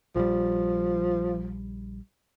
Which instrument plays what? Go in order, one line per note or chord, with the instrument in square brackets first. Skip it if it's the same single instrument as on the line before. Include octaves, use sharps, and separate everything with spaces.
[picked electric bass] A#1 G3 [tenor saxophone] F3